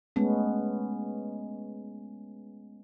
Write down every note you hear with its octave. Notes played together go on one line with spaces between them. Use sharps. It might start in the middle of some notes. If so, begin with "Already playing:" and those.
G#3 A3 B3 C#4